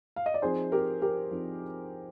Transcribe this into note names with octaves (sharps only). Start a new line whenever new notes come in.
F5
D#5
D5
F3 C4 D#4 G#4 C5
G4 A#4
G4 A#4
F3 C4 D#4